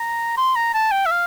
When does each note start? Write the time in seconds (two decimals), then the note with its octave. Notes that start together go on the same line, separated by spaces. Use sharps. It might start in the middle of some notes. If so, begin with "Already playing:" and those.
Already playing: A#5
0.37 C6
0.56 A#5
0.74 A5
0.92 G5
1.06 E5
1.11 F5